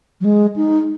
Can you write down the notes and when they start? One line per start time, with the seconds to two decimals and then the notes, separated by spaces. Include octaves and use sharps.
0.21 F#3
0.25 G#3
0.56 D#4